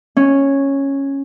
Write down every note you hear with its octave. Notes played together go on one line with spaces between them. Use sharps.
C#4